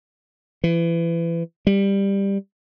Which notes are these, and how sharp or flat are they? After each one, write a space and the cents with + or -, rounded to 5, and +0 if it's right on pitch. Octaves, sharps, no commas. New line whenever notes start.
E3 +25
G3 +10